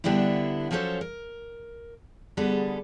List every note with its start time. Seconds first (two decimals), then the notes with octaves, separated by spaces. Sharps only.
0.04 D3 G3 B3 D4 E4
0.71 F3 F#3 C#4 A4 C5 C#5
1.01 A#4
2.37 D3 G3 B3 G#4 A4